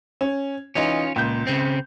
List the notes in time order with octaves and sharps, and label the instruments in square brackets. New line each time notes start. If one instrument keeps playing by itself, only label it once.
[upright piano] C#4
[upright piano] E3 D#4 [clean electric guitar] C#4 F4
[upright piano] C#2 G6 [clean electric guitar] A#2
[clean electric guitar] C#3 C4